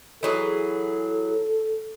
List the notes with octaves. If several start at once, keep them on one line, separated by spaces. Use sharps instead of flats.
E3 F#3 G#4 A4